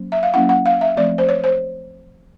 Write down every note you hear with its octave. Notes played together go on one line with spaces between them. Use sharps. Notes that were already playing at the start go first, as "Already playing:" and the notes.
Already playing: F#3 A#3 C#4
E5
F5
F#3 A#3 C#4 E4 F#5
F#5
F5
E5
F3 A3 C4 D5
C5
C#5
C5